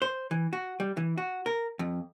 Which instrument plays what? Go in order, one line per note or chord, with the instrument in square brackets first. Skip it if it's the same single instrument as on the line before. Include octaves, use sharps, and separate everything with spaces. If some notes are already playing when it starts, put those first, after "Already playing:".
[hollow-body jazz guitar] C5
E3
F#4
G3
E3
F#4
A#4
F2